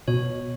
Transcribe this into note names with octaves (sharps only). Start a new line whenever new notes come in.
B2 C#5